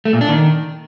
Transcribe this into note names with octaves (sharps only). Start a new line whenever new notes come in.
A3
A#2
D4
D#3